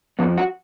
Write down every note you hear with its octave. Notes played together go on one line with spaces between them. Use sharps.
F2 F3 B3
F#4